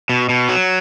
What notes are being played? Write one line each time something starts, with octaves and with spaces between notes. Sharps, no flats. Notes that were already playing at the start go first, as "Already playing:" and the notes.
B2
B2
F#3